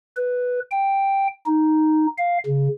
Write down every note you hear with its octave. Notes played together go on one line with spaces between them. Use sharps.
B4
G5
D#4
F5
C#3